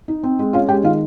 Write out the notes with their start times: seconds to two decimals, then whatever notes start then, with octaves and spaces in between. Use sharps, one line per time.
0.08 D#4
0.23 C4
0.39 G#3
0.53 C#4 F4 F5
0.69 G#3 G4 G5
0.84 D#3 F4 F5